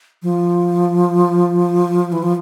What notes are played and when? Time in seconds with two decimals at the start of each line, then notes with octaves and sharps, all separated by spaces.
0.23 F3
2.12 E3
2.22 F3